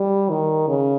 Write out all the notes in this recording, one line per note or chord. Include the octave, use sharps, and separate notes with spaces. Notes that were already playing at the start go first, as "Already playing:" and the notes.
Already playing: G3
D#3
C#3